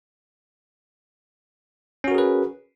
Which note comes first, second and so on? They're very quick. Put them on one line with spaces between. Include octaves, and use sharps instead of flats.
C#4 F#4 A#4 G#4 B4